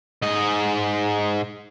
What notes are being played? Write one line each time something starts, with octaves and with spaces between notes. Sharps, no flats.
G#2 D#5